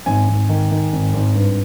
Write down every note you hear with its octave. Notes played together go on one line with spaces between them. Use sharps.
G#1 G#5
G#1
D#3
D#3
G#1
G#1
G2